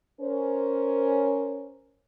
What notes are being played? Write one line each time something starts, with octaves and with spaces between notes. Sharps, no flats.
C#4 A#4 C5